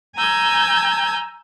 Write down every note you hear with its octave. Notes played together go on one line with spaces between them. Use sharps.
G#5 A#5 E6 G6 G#6